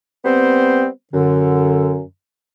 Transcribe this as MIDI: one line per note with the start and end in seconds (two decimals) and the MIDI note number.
0.25 0.86 55
0.25 0.86 59
0.25 0.86 60
0.25 0.86 72
1.13 2.01 42
1.13 2.01 50